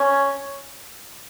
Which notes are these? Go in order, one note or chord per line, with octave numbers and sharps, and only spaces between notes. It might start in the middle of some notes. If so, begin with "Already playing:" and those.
Already playing: C#4